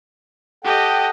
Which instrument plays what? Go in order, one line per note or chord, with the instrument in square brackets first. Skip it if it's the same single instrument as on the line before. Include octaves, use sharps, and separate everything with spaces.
[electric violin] G4 D#5 [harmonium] A4 F#5 G5